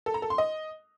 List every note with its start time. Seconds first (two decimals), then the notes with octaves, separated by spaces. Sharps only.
0.06 A4
0.14 A#5
0.22 A4
0.30 C6
0.38 D#5